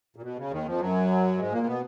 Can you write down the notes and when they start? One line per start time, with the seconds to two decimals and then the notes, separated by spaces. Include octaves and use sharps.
0.16 A#2
0.22 B2
0.37 C#3
0.51 D#2 D#3
0.66 F2 F3
0.80 F#2 F#3
1.37 G#2 G#3
1.52 A#2 A#3
1.66 B2 B3